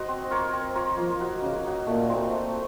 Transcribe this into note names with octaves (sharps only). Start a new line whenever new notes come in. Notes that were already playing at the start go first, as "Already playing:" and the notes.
Already playing: D#4 F#4 C5 D#5
C4
F4 A#4 C#5
C4
F4 A#4 C#5
F3 A#3
D#4 F#4
C#3 A#3
D#4 F#4
A#2 A3
C4 D#4
A3